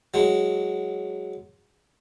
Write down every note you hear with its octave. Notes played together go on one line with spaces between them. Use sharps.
F#3 G#3